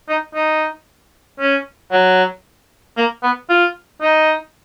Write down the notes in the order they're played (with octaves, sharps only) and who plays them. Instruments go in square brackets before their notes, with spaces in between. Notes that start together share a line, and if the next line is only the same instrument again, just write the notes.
[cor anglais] D#4
D#4
C#4
F#3
A#3
B3
F4
D#4